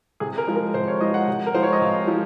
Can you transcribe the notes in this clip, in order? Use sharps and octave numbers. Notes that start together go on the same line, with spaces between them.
C3 G#4
A#4
F3 G#3
A#4
C3 C5
C#5
F3 G#3 D#5
F#5
C3
A#4
F3 G#3 C5
C#5
D#5
C3 F5
F3